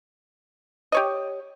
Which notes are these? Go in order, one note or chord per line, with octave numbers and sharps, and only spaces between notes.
G4 C#5 D#5